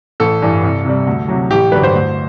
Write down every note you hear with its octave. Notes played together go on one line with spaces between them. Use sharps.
A1 A4
G2 E3 G3
C2
C3 G3
D2
C3 F#3
A1 G4
G2 D3 F#3 B4
C5
D2